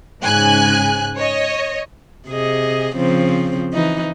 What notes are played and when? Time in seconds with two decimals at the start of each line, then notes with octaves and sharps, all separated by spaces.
0.23 G#2 C#3 G#5 F#6
1.16 C#5 D#5
2.28 C3 G#4 D#5
2.95 C#3 F3 C4
3.73 E3 D#4